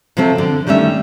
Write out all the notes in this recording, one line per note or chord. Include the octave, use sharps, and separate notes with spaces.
C3 F3 F#3 C4 A4
D3
D#3 G3 A3 C#4 E5